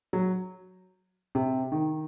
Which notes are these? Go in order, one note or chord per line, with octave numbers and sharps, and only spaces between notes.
F#3
C3
D#3